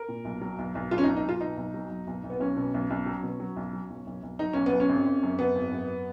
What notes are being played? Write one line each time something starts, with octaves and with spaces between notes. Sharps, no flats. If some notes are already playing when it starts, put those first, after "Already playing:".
Already playing: A#4
A#2
B1
F#3
B1
B1
B1 F4
C#4
B1 D#4
D#4
B1 F4
B2 D#4
B1
F#3
B1
B1
B1
B3
B1 C#4
B2
B1
B1
F#3
B2
F#3
B1
F#3
B1
B1
B1
F#3 D#4
B1 C#4
B3
B1
C#4
G#1
G#1
F#2
F#2 B3
G#1
F#2